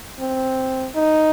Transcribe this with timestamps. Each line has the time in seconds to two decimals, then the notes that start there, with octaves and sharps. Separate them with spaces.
0.20 C4
0.96 D#4